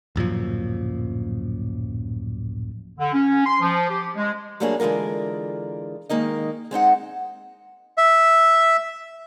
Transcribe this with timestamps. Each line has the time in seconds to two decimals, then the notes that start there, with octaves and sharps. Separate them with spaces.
0.16 D1 F#2 A#2 F3
2.99 D3
3.12 C#4
3.46 C6
3.61 F3
3.89 G4
4.16 G#3
4.60 F#3 G3 A3 A#3 D4 G#4
4.80 D3 E3 G#3 F4 A#4
6.09 D#3 G#3 A#3 D#4 D#5
6.71 G#3 C4 D#4 F#5
7.97 E5